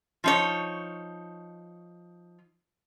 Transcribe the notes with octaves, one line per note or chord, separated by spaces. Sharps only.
F3 D#4 C#5